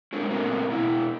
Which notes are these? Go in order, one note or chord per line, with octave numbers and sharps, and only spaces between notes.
F#3 G#3 C4 D4 A#4
A#2 A3 B3 C4 A#4
B2 B3 E4